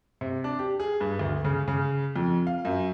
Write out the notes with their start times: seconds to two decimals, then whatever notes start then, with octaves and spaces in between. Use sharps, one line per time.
0.21 C3
0.44 D4
0.59 G4
0.80 G#4
1.00 G2
1.19 D2
1.45 C#3
1.68 C#3
2.16 F2
2.47 F5
2.65 F#2